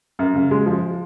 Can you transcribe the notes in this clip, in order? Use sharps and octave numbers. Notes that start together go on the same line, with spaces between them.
F#2
C#3
G#3
F3